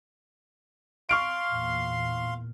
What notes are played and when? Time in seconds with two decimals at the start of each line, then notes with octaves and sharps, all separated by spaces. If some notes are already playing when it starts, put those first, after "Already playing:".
1.09 F5 C6 C#6 F6 D7
1.51 E2 A#2